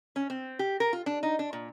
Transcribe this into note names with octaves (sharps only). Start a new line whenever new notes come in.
C#4
C4
G4
A#4
F4
D4
D#4
D4
A#2